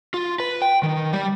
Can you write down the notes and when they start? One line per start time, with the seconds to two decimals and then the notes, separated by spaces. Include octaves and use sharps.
0.14 F4
0.40 B4
0.62 G5
0.83 D#3
1.13 G3